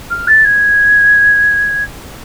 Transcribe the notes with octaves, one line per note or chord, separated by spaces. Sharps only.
F6
A6
G#6